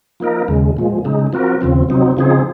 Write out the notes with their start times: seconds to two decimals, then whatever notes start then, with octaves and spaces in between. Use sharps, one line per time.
0.20 F3 A#3 D#4 A#4
0.48 D#2 C#3 G#3
0.77 A#2 F3 G#3
1.05 C#3 G#3 D#4
1.33 F3 C4 F#4 A#4
1.61 D#2 C#3 F3 C4
1.89 C3 F#3 C4 D#4
2.17 C#3 F3 C4 D#4 G#4